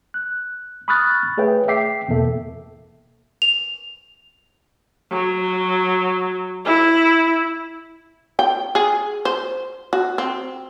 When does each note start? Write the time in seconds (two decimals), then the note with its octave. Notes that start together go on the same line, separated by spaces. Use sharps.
0.14 F#6
0.88 B5 C#6 D#6 F6 F#6 A6
1.37 A3 G#4 B4 C#5 E5 G5
1.68 E5 G5 D6 B6 C7
2.08 E2 B2 A#3 A4 E5
3.42 F7
5.11 F#3
6.65 E4
8.39 G5
8.75 G#4
9.25 C5
9.93 F#4
10.18 C4